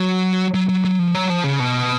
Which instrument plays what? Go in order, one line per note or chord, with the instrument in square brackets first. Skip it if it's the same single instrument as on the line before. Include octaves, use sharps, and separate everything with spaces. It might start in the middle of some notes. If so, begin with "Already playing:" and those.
Already playing: [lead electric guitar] F#3
F#3
F#3
F#3
F3
F#3
F3
C#3
B2